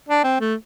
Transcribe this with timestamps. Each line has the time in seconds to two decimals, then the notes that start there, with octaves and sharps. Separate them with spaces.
0.09 D4
0.24 C4
0.40 A3